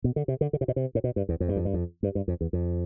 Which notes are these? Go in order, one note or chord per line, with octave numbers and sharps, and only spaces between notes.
B2
D3
C3
D3
D3
C3
B2
C3
A2
B2
G2
E2
F2
G2
F2
G2
F2
G2
G2
F2
E2
F2